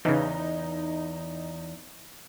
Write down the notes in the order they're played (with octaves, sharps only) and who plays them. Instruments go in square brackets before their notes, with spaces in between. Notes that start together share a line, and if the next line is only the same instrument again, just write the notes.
[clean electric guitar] E2 [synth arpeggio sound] C#3 E3 [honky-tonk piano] D#4